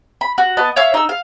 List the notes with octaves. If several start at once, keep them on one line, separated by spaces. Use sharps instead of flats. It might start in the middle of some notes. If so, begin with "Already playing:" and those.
B5
F#4
B3 D#5 A5
C#5 E5 F5 E6
D#4 E6
F5